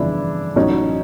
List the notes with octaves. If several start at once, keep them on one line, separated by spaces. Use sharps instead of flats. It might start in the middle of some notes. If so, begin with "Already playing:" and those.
Already playing: G1 F2 C#3 E3 D4 E4
A1 A2 F#3 C#4 D#4